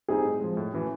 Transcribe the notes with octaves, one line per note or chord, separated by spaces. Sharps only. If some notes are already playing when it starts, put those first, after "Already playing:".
G3 C4 D#4 G4 G#4
A2
F3 G#3
A2
E3 A3 C#4 F#4